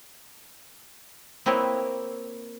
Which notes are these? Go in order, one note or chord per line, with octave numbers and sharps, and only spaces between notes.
A#3 C4 E4 B4 C#5 D#5